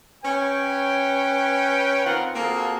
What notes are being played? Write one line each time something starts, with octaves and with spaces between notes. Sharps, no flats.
C#4 B4 C#5 G5
D#3 C4 F4 A#4 F#5
A#3 C4 F4 F#4 G#4 A4